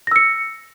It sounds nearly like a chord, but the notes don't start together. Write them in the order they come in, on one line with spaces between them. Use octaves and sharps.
A#6 E6 C#7